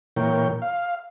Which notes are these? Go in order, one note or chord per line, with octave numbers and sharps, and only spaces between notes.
A#2 E3 A#4 C#5 G5
F5